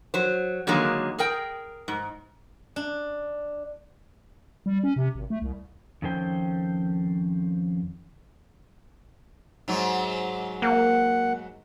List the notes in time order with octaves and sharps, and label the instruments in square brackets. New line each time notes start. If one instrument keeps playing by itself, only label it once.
[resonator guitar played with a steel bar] F#3 C5
D3 D#3 F#3 G#3 A#3
G#4 A#4 G5
G#2
[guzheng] D4
[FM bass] G3
C#4
C3
G#1
A3
C2
[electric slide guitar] F2 D#3 C#4 A4 C5 G5
[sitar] G#2 F#3
[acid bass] A#3 [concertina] F#5